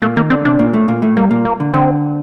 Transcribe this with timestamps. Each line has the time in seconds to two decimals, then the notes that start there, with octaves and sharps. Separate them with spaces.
0.02 A#2 A3 A#3
0.16 D#3 A#3 D#4
0.30 D3 C4 D4
0.45 C3 C4 D4
0.59 A#2 A#3
0.73 A2 A3
0.88 A#2 A#3
1.02 A2 A3
1.17 G2 G3 A#3
1.31 A#2 A#3
1.45 A#3
1.60 D3
1.73 D3 C4